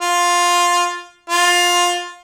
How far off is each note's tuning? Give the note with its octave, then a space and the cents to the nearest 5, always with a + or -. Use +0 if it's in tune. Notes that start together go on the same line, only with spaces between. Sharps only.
F4 +10
F4 +15